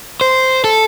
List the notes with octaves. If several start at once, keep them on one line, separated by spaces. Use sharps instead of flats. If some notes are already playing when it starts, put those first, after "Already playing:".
C5
A4